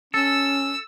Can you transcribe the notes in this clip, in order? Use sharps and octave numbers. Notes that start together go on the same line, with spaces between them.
C#4 A4 E6